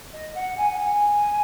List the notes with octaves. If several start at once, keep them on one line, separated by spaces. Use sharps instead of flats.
D#5
F#5
G#5
F#5
G#5